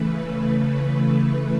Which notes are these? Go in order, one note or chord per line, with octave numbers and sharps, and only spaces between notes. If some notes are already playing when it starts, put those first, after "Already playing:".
Already playing: C#3 E3 A3 B4